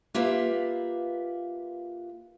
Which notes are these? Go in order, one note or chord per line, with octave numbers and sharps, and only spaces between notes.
A#3 F4 G4 B4 E5